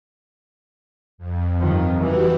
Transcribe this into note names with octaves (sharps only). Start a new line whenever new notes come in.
F2
G2 D#3 F3
E3 F#4 G4